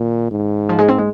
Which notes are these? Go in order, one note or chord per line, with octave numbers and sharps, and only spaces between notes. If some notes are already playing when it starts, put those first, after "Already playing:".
Already playing: A#2 D#3
G#2
F3
G#3
C4
G#3